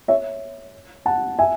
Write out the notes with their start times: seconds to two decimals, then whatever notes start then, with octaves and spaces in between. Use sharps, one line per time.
0.08 C#5 E5
1.06 F#5 A5
1.39 E5 G#5